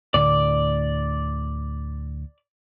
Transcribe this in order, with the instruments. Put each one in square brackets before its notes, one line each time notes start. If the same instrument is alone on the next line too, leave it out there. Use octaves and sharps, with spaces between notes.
[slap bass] D2 A2 D3 [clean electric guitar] D5